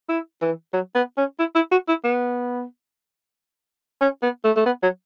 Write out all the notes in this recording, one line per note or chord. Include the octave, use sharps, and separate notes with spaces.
E4
E3
F#3
B3
C#4
E4
E4
F#4
E4
B3
C#4
B3
A3
A3
B3
F#3